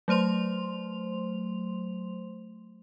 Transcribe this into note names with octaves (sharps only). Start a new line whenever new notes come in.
F#3 A3 C5 C6 F7